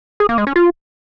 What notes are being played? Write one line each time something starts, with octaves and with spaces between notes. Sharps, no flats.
G#4
A#3
G#3
C#4
F4